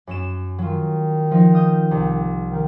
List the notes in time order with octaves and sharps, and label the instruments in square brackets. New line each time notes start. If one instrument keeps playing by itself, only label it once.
[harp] F#2 C#4 E7
[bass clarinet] D#3 [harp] F#3 F4
[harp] F3 D#4
F5 D#6 G6
C2
[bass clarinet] D#3